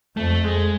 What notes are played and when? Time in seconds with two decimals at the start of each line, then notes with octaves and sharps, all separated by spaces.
0.17 F2 A3
0.44 G#3